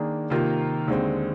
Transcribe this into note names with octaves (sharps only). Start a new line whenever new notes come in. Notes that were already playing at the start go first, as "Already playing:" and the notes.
Already playing: D#3 A#3 D4 G#4
C3 D#3 A#3 F4 A#4
D#2 D3 G#3 C4